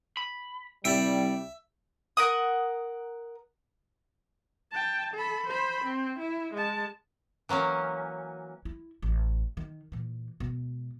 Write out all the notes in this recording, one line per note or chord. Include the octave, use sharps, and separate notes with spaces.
B5
C2 G3 D5 E5 G5
A#4 F#5 D#6
G5 A5
A4 B5
C5 B5
C4
E4
G#3 A5
E3 F#3 A#3 C#4
E4
A1
D#3
A#2 E3
B2 G#3